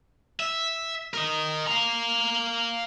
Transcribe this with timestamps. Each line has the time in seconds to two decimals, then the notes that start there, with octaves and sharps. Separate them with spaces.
0.40 E5
1.14 A#4 D#5
1.67 F5 A#5